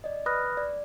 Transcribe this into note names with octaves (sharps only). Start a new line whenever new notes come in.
D5 D#5
B4 B5 D#6 F6 F#6 A#6
D5